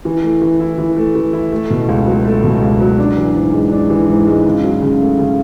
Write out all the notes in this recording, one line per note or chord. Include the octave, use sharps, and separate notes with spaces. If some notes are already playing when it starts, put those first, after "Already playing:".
E3
A3
E3
E4
E3
A3
E3
E4
A3
B2
C#2
F#3
A3
B2
C#2
F#3
D4
E3
G#2
G#3
D4
E3
G#2
G#3
C#3
F#3
C#3
A3
C#3